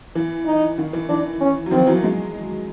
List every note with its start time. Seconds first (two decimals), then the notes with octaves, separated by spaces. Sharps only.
0.15 E3
0.46 D#4
0.78 D#3
0.93 E3
1.09 E3 D4
1.41 C#4
1.66 F#3
1.71 D#3 F3 C4
1.87 E3 F#3
2.02 F#3 G#3